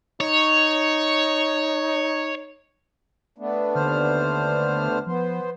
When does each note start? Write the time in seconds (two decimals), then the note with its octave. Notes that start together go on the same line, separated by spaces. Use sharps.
0.21 D#4 C#5
3.38 A3 B3 D4
3.75 D#2 D3 C5 F6
5.07 F3 B3 C5